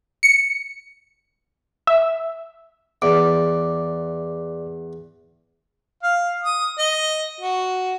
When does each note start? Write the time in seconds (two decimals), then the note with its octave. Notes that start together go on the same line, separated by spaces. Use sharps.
0.23 C#7
1.87 E5
3.02 E2 D5 D6
6.02 F5
6.44 D#6
6.78 D#5
7.41 F#4